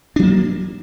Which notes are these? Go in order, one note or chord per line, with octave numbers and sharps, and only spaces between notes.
F#3 A#3 D4